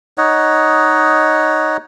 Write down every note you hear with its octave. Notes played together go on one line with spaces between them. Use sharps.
D#4 C#5 D#5 F#5